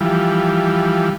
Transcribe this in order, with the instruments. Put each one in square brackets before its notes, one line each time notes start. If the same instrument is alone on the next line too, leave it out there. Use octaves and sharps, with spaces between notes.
[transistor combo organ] E3 F3 G3